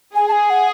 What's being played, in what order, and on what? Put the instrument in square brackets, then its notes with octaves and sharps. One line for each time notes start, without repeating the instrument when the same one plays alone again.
[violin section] G#4 [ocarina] G#5
[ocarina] A5
G#5
F#5